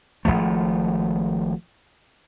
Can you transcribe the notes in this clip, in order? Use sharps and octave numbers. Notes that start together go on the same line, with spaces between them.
G#1 F#2 F3 A3